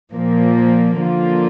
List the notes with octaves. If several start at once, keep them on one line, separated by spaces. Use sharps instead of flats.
A#2 F3 A#3
D3 F3 A#3 F4